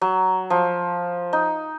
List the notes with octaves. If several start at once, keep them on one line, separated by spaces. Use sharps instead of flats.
F#3
F3
D#4